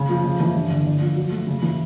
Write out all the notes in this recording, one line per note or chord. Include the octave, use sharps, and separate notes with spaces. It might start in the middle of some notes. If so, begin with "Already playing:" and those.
Already playing: C#3
F3
C#3
E3
G2
D3
D3
F3
F#3
A3
C#3
E3